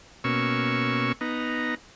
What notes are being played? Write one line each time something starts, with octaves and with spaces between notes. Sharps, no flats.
B2 A#3 C#4 C#6 E6
B3 D#4 A#5